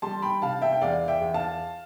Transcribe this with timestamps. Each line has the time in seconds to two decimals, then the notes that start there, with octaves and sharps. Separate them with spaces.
0.02 G3 A5 C6
0.22 G5 B5
0.42 C3 F5 A5
0.62 E5 G5
0.72 G5
0.81 E2 D5 F5
1.08 E5 G5
1.21 E2
1.34 F5 A5